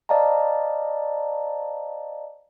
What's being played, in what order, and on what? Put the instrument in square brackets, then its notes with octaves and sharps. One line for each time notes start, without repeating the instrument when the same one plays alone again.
[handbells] C5 D5 D#5 F5 A5 A#5